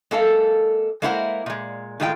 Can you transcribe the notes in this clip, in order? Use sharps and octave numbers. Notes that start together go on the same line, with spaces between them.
G#3 A#3 A4 F5
G#3 A#3 E4 A#4 C5 F#5
A#2 G#3
A2 D#3 G#3 F4 E5 G5